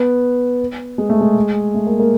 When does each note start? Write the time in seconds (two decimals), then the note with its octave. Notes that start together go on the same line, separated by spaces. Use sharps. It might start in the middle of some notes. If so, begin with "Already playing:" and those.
Already playing: B3
0.98 G#3
1.09 A3
1.21 G#3
1.74 A3
1.87 A#3
2.00 A#3